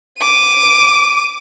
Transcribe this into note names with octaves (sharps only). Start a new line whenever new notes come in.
D6 D#7